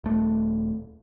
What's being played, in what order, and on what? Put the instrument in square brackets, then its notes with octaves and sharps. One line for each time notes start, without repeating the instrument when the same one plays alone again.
[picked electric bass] D#1 A3